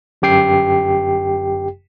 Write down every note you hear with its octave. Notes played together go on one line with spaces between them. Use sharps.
G1 F#2 G4 G5 C7